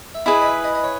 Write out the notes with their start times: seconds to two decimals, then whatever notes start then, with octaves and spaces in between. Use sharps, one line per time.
0.15 E5
0.26 E4 G#4 B4 D#5
0.41 D#5
0.46 E5
0.64 D#5
0.75 D#5
0.84 C#5